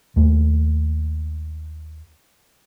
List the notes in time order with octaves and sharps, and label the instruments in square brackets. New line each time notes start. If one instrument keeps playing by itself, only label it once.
[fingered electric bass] D#2 A3